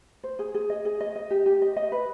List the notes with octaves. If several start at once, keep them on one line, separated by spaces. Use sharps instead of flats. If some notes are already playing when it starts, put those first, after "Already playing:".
C5
G#4
G#4
D#5
G#4
D#5
D#5
G4
G4
D#5
D#5
B4